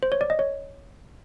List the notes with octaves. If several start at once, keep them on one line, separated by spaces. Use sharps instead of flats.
C5
C#5
D5
D#5
C#5